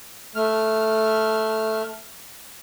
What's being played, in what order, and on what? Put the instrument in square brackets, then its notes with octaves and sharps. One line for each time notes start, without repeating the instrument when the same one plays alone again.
[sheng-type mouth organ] A3 F6